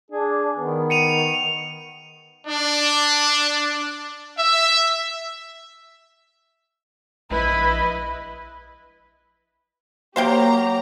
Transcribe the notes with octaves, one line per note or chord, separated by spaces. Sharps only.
D4 G#4
D#3 B3
C#7 D#7 F7
D4
E5
A#1 E4 B4 D#5
F#3 A#3 G4 C5 F5 G5 A#5